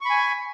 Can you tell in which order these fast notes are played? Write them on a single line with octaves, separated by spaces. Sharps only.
C#6 B5 G#5